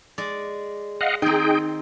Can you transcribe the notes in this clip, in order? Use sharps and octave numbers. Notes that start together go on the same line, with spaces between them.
G#3 D5
D#5 F5 F#5
D#3 C4 D#4 G#4 G5